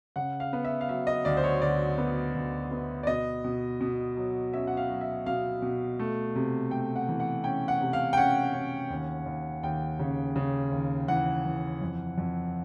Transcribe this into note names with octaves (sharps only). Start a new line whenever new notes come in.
C#3 F#5
F5
B3
E5
F5
F#3 E5
D#5
D2 D5
C5
C#5
D2 D5
B3
D2
B3
D5
B2 D#5
B2
B2
F#3
C#4 E5
F#5
F5
F#3
E5
B2 F5
B2
A3
C3
A3 G5
F#5
E3
F#5
C#4 G5
F#5
C3
F5
G5
C#4 F#5
C#4
D#2
D#2
D#2 G5
C#3
C#3
D#2
E3 F#5
E3
F2
F2